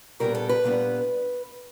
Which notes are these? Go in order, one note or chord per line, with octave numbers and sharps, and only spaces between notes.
A#2 G3 B3 D4 A#4
A4
B4
A#2 G3 B3 D4